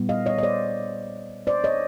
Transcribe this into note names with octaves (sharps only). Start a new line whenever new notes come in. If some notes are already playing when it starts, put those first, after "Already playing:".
Already playing: A#2 G3 B3 E4
D#5 F5
C#5 D#5
D#5
C5 D5
C5 D5
C#5 D#5